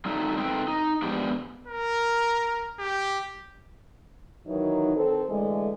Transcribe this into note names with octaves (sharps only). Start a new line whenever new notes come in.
F#3 G3 A3 C4 D#4
C4 D#4 A4 B4 F#5 G5
D#4
G#2 F3 B3 D4 G4 D5
A#4
G4
D#3 E3 F#3 D#4
D#3 C4 A4
D3 E3 G#3 A3